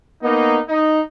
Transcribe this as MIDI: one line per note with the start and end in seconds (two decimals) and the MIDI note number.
0.22 0.59 58
0.22 0.59 59
0.22 0.59 63
0.69 1.00 63